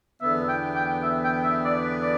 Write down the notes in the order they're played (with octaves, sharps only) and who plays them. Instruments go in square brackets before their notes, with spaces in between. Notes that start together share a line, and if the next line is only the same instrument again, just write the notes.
[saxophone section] E2 D3 B3 [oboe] E5
[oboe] G5
G5
E5
G5
E5
D5
B4
D5